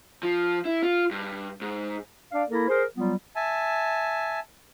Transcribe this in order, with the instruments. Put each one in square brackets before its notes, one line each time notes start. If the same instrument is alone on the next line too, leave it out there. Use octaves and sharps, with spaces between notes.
[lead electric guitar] F3
E4
F4
G2
G#2
[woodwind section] D4 D5 F5
A#3 E4 A4 A#4
G#4 A#4 C5
F#3 G3 B3 F4
[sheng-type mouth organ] E5 G#5 A5